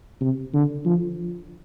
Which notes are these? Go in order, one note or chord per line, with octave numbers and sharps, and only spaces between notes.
C3
D3
F3